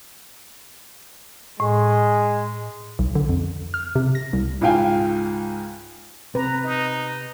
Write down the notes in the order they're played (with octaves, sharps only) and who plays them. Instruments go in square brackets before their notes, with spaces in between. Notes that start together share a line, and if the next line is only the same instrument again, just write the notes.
[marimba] A2 [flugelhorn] G#3
[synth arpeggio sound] B1
D3
F2
F6
C3
A#6
C2
[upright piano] C#2 G#2 F5 G5 G#5
[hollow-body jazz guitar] C3 [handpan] B4 [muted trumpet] A#5
[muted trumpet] D#4